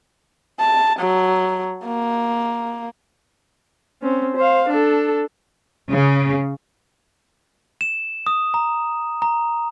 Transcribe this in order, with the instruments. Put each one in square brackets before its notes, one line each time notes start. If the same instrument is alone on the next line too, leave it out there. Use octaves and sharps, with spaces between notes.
[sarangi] A5
F#3
A#3
[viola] C4 C#4
C5 F5
D4 A4
[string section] C#3
[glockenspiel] E7
D#6
A#5
A#5